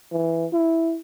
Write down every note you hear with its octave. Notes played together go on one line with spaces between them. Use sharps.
E3
E4